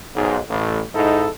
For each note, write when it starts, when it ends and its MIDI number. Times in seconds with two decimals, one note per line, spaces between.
0.16 0.39 35
0.16 0.39 44
0.49 0.81 33
0.49 0.81 45
0.94 1.28 44
0.94 1.28 63
0.94 1.28 64
0.94 1.28 69